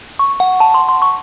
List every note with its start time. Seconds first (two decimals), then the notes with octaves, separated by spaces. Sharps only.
0.19 C#6
0.40 F#5
0.60 A5
0.74 C6
0.89 C6
1.02 C#6